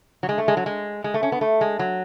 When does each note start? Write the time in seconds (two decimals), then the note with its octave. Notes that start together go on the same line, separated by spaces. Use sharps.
0.23 F#3
0.29 G#3
0.38 A3
0.48 G#3
0.57 F#3
0.66 G#3
1.04 G#3
1.14 A3
1.23 C#4
1.32 B3
1.41 A3
1.61 G#3
1.79 F#3